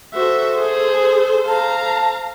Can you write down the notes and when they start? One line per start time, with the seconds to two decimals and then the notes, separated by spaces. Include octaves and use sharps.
0.14 F#4 A4 C5 E5
0.60 G#4
1.48 F5 A5 A#5